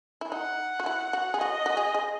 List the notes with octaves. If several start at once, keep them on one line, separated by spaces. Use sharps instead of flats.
E4
D#4 F#5
F#4
E4
F#4
G#4
F#4 D#5
F#4
G#4
G#4